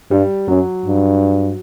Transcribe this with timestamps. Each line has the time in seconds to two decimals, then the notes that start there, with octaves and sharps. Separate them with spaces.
0.11 G2 G3
0.48 F#2 F#3
0.86 G2